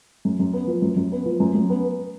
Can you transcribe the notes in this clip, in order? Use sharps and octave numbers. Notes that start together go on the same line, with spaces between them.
F#2
F#2
B3
F3
F#2
F#2
B3
F3
F#2
F#2
B3